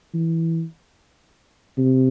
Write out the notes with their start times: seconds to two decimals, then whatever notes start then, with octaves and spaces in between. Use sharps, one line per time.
0.14 E3
1.78 C3